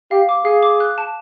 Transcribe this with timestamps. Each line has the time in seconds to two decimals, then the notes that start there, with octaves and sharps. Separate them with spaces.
0.11 G4 F5
0.29 D6
0.45 G#4 F5
0.63 D6
0.80 F#6
0.98 A5